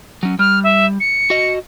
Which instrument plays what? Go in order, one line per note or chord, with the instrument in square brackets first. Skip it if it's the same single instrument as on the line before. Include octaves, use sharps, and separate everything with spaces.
[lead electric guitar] F#3 C#4
[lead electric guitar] G3 [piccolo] F6
[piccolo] E5
C#7
[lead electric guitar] F#4 D#5